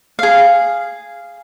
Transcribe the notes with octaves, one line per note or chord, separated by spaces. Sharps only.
G#4 F5